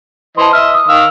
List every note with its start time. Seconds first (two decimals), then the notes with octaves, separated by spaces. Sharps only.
0.37 E3 C5 D#5 A5 C6
0.53 D#5 E5 F6
0.74 D#6
0.88 D#3 F5 E6